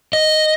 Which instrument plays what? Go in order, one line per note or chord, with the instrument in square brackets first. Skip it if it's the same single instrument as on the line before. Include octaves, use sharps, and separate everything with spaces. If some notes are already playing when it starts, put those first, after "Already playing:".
[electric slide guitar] D#5